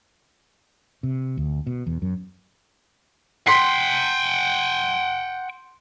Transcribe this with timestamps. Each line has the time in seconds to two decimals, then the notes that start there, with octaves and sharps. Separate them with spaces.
1.03 C3
1.37 D2
1.67 B2
1.87 E2
2.02 F#2
3.47 F#5 G5 C6 B6 C7